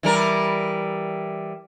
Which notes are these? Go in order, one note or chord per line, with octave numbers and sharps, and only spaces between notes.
E3 G3 A#4